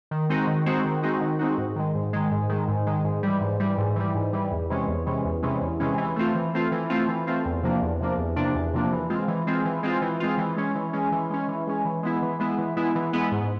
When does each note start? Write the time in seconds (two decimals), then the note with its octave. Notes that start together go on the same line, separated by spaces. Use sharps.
0.11 D#3
0.29 G#3 C4 D#4 F#4
0.47 D#3
0.66 G#3 C4 D#4 F#4
0.85 D#3
1.03 G#3 C4 D#4 F#4
1.21 D#3
1.39 G#3 C4 D#4 F#4
1.58 G#2
1.76 D#3 G#3
1.95 G#2
2.13 D#3 G#3
2.31 G#2
2.49 D#3 G#3
2.68 G#2
2.87 D#3 G#3
3.04 G#2
3.23 E3 G3
3.41 G#2
3.60 E3 G3
3.78 G#2
3.96 E3 G3
4.15 G#2
4.33 E3 G3
4.51 E2
4.70 C3 E3 G#3 C#4
4.88 E2
5.06 C3 E3 G#3 C#4
5.25 E2
5.43 C3 E3 G#3 C#4
5.61 E2
5.80 C3 E3 G#3 C#4
5.98 E3
6.16 A3 C4 F4
6.35 E3
6.54 A3 C4 F4
6.72 E3
6.90 A3 C4 F4
7.08 E3
7.27 A3 C4 F4
7.45 E2
7.63 C3 F3 A#3 D4
7.82 E2
7.99 C3 F3 A#3 D4
8.18 E2
8.36 C3 F3 A#3 D4
8.55 E2
8.73 C3 F3 A#3 D4
8.92 E3
9.10 G#3 C4 F4
9.28 E3
9.47 G#3 C4 F4
9.65 E3
9.83 G#3 C4 F4
10.02 E3
10.20 G#3 C4 F4
10.38 E3
10.56 G#3 C#4
10.75 E3
10.93 G#3 C#4
11.12 E3
11.30 G#3 C#4
11.48 E3
11.67 G#3 C#4
11.85 E3
12.03 G#3 B3 E4
12.22 E3
12.40 G#3 B3 E4
12.58 E3
12.77 G#3 B3 E4
12.95 E3
13.13 G#3 B3 E4
13.32 G#2